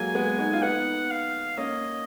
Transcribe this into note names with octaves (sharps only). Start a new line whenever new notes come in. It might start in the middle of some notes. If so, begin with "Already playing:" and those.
Already playing: F#3 G#3 A#3 G#5
G#3 B3
B3 D#4
F4
B3 D#4 F#5
F5
A#3 C#4 D#5